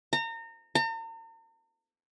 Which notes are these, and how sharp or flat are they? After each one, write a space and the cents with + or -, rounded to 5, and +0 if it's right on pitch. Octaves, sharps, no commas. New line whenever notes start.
A#5 -30
A#5 -45